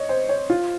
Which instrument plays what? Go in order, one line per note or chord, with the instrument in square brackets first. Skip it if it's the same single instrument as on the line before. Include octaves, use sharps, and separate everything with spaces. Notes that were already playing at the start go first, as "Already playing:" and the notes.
Already playing: [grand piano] C#5 D#5
C5
C#5
F4